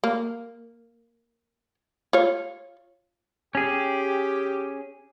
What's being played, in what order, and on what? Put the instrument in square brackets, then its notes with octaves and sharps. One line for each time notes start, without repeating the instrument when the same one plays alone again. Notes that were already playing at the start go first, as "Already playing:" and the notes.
[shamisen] A#3
F4 C#5
[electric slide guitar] C#4 G#4 [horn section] G4